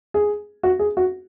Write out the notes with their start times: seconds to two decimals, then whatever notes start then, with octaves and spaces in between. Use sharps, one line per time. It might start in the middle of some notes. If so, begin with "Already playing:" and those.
0.14 G#4
0.63 F#4
0.79 G#4
0.97 F#4